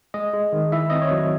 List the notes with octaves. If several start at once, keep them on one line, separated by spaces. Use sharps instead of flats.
G#3 D#5
G#3
D#3
E4 E5
C4 D#5
C#5
F#3